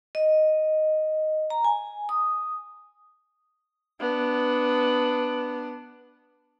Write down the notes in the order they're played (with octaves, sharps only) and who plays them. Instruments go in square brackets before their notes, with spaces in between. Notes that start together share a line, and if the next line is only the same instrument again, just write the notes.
[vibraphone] D#5
A#5
G#5
D#6
[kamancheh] B3 D4